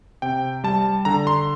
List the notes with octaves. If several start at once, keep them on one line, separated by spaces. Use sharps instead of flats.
C3 G5
G3 A5
D3 A#5
C6